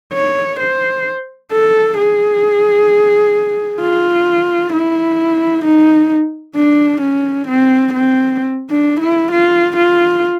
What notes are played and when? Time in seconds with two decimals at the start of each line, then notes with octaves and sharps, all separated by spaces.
0.13 C#5
0.60 C5
1.52 A4
1.97 G#4
3.81 F4
4.73 E4
5.65 D#4
6.56 D4
7.01 C#4
7.48 C4
7.93 C4
8.70 D4
9.00 E4
9.32 F4
9.76 F4